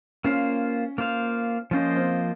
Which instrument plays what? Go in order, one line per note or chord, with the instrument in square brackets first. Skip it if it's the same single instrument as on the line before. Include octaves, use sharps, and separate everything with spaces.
[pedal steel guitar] A#3 F4 C5 F5 [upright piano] C#4
[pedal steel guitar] A#3 F4 C5 F5
[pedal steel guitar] F3 A#3 F4 C5 D#5 [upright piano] C#4
[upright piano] C4